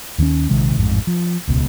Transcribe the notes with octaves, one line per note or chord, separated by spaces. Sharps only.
D#2 D#3 A3 C#4
A#1 C3 D#3 G#3
A1 F2 G#2
F3
D#1 C#2 B2